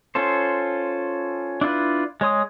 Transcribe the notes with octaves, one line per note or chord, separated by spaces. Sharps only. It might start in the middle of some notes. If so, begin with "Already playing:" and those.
C#4 F4 A4 C5
D4 E4 F4 B4
G#3 C#5 C6 D#6